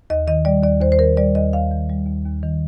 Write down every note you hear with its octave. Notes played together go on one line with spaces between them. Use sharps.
D#2 D#5
D#3 D#5
G3 D5
D#2 D5
D#2 C5
C5
D#3 A#4
G3 D5
D#2 D#5
D#2 F5
D#3
G3
D#2
D#2
D#3